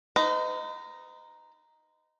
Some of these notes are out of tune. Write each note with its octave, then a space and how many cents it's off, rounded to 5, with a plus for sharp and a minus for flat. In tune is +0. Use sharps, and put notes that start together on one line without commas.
D#4 +0 C5 -45